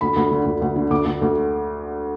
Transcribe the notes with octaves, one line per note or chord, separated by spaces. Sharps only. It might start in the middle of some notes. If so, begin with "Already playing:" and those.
D2 B5
D2
D3
D2
D2
D3
D2 D6
D2
D2